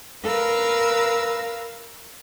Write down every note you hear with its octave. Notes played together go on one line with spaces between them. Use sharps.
A#4 B4 F5 E6